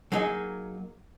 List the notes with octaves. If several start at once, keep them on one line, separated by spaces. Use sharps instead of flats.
F#3 A#3 D#4 G#4